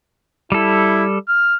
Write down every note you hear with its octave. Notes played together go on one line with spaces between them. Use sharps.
G3 E4 A4
F6